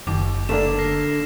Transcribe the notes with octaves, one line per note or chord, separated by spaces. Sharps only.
F#1 D#2 D6
D3 A3 A#3 D4 E7
F6 A#6 C7